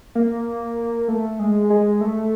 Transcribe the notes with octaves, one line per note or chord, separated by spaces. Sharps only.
A#3
A3
G#3
G#3
A3